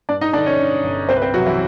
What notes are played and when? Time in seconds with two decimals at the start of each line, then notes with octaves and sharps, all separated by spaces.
0.09 G2 D4 D5
0.21 D#4 D#5
0.33 D3 D4 D5
0.46 C#4 C#5
0.59 D3
0.84 G1
1.09 C2 C4 C5
1.16 B4
1.22 C4 C5
1.34 C3 F#3 F#4
1.46 E3 E4